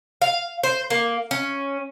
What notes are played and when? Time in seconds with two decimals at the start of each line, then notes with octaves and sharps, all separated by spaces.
0.22 F5
0.63 C5
0.90 A#3
1.31 C#4